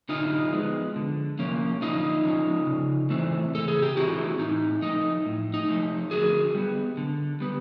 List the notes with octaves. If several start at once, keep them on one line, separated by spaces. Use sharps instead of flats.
D3 D#4 F4
F3 G#3 B3
D3
F3 A#3 C#4
D3 D#4 F4
F3 A#3 C#4
C#3
E3 A3 C4
C#3 A4
G#4
G4
E3 A3 C4 E4 F#4
A2 D#4
F3 A3 D#4
A2
D#4
F3 A3
D3 F#4 G#4
G3 B3
D3
G3 B3